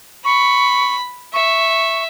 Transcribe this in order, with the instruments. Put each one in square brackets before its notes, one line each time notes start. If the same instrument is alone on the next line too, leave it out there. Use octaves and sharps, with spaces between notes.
[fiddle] B5 [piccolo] C#6
[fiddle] E5 [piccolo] C#6